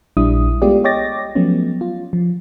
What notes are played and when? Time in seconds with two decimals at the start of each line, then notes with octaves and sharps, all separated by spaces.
0.17 A#1 G3 D4 E4 D#6
0.62 G#3 A3 B3 F4 G4 D5
0.84 C#5 D#5 G5 D6 A6 A#6
1.35 F3 F#3 A3 B3 C#4
1.81 F4
2.13 F3